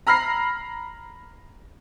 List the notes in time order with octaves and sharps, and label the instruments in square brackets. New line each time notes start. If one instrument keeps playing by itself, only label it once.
[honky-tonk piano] A#5 B5 F6 A#6 C7